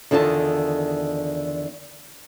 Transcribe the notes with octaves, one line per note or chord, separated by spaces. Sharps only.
E2 D3 D#3 F4 C5 A5